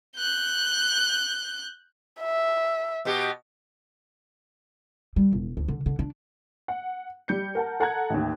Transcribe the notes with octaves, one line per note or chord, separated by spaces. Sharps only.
F#6 G6
E5
B2 B3 G4
G3
E1
D2
D3
D3
D4
F#5
G3 G6 C#7
A#4 F#5 A5
A4 F#5 A5 A#5 F#6 G#6
A1 D#2